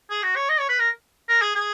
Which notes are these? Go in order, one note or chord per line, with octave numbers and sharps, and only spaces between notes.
G#4
F#4
C#5
D#5
C#5
B4
A#4
A#4
G#4
G#4